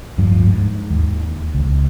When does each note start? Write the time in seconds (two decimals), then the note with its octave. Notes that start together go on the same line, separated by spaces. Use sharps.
0.18 D1 G2 F3
0.47 G#2
0.90 D#2
1.55 C#2